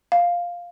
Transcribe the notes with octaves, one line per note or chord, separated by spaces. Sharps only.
F5